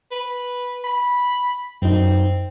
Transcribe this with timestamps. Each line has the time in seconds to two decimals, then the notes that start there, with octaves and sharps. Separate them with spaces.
0.11 B4
0.84 B5
1.82 F#2 C4 D#4